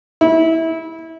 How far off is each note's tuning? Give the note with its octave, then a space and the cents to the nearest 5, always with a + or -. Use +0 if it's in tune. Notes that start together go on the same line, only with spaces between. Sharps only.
E4 -20